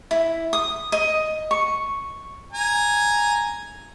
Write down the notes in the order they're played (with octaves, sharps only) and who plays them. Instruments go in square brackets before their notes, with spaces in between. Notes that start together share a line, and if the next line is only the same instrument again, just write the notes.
[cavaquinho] E4
D#6
D#5
C#6
[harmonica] G#5 A#5